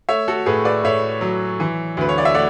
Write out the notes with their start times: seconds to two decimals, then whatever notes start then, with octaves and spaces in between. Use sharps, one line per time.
0.09 A3 C#5 E5
0.28 F#4 A4
0.46 A2 G#4 B4
0.65 B4 D5
0.84 A2 C#5 E5
1.21 F#3
1.60 E3
1.97 D2 B4
2.09 C#5
2.18 D5
2.25 E5
2.34 A3 D5 F#5